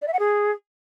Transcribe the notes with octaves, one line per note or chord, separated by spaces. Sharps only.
D5
E5
F#5
G#4